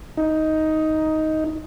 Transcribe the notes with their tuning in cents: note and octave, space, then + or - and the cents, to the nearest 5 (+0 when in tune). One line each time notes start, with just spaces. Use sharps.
D#4 +10